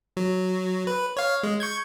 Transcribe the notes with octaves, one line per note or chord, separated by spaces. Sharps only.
F#3
B4
C#5 F5
G#3
C#6 G6 G#6